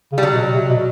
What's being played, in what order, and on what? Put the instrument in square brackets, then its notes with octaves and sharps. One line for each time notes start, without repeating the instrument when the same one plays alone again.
[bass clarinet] C#3
[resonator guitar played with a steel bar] G3
F#3
[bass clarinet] B2
C3
B2